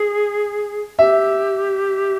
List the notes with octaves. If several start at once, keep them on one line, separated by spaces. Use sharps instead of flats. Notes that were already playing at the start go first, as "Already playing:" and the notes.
Already playing: G#4
G4 E5